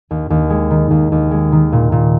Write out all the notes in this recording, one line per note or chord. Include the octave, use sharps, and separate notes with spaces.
D#2
D#2
G#3
D#3
D#2
D#2
G#3
D#3
A#2
A#2